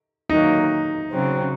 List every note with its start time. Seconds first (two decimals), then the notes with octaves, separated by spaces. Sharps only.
0.30 D#3 F#3 A#3 D#4
1.12 C#3 F#3 C4